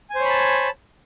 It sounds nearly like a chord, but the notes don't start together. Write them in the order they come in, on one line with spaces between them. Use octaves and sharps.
G#5 C5 C#5 B5 A5